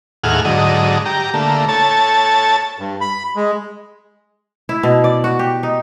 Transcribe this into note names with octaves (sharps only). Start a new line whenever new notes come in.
D#2 A2 G#4 F#5 F6
G#2 D3 F#3 D#5
G4 A#5
D3 A3 A#3
A4 C#5 A5
G2
B5
G#3
E4
B2
D5
F#4
G4
D#4